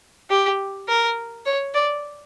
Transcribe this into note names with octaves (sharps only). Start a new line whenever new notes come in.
G4
A#4
C#5
D5